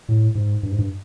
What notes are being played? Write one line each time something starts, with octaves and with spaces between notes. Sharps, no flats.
A2
G#2
G2
G#2
G2